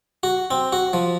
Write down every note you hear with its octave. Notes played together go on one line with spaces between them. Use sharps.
F#4
C4
F#4
F3